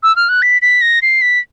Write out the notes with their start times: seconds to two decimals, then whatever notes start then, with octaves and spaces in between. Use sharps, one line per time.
0.03 E6
0.16 F6
0.29 F#6
0.42 B6
0.62 B6
0.81 A#6
1.02 C7
1.22 B6